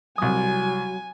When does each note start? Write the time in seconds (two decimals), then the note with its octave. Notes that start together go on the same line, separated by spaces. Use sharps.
0.18 C2 F#3 G#5 D#6